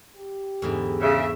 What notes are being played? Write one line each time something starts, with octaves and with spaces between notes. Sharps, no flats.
G4
E2 G#2 D3
C#3 E5